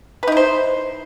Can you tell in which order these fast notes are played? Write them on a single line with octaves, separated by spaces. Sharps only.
B4 D#4 E4 C5